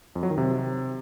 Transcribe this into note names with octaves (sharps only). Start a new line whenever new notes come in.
F2
F#3
D#3
C3